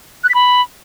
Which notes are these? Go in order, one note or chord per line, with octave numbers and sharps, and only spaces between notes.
F#6
B6
B5